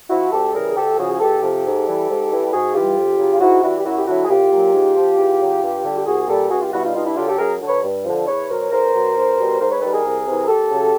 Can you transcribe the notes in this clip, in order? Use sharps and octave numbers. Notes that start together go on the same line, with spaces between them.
F3 E4 F#4
D2 G4 A4
C#3 E3 G3 G#4 A#4
G#4
D2 G4 A4
C#3 F3 F#4 G#4
G#4
C#2 G4 A4
C3 F3 G4 A4
G#2
E3 G3
G#2
E3 G3
G4
G#2 F#4 G#4
E3 G3 F4 G4
F2
C#3 F#3
F4
G#2 E4 F#4
E3 G3 E4 F#4
G4
F#2 E4 F#4
G4
D3 F#3 E4 F#4
G#4
C2 F4 G4
A#2 F#3
G#2
F3
E2
C#3 F#3
G2
D3 G3
G4
C2 F#4 G#4
A#2 G3 G4 A4
C#2 F#4 G#4
F4 G4
B2 G3 E4 F#4
D#4 F4
G2 D#4 F4
D4 E4
D3 F#3 F4 G4
G4 A4
F#2 G#4 A#4
D3 F#3
B4 C#5
G2
D3 F3
E2 B4 C#5
B2 F#3 A#4 C5
C#5
E2 A#4 C5
B2 F#3
E2
B2 G3
G#2 A#4 C5
B4 C#5
D#3 G3 A4 B4
G#4 A#4
C2
C3 E3
A#4
D#2 G4 A4
C#3 F#3